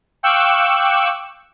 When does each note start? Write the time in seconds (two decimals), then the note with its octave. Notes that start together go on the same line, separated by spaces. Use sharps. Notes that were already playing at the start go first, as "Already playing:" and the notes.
0.23 F5 G5 C#6 D6 E6 F#6